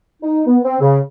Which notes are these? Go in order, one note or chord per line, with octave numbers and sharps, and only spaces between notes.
D#4
B3
C4
C#3